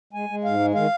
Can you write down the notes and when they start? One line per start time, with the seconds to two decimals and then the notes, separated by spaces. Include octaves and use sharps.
0.13 G#3 G#5
0.29 G#3
0.44 G#2 F5
0.59 G#3
0.75 D#3 F5